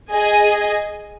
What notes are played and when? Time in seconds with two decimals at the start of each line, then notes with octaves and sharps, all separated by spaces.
0.12 G#4 D#5 G#5